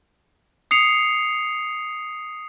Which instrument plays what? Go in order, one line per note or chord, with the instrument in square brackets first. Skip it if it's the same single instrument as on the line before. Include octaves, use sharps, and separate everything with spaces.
[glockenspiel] D#6 C7 C#7 F7